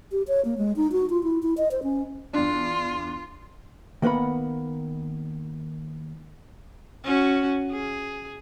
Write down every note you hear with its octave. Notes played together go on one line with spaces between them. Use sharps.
G4
C#5
A#3
G#3
D#4
F#4
F4
E4
E4
D#5
C5
C#4
E2 D4 F4
D#3 A#3 B3 F#5 B5
C#4 F#4
G#4